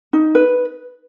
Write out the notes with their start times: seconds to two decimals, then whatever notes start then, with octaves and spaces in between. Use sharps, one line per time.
0.13 D#4
0.35 B4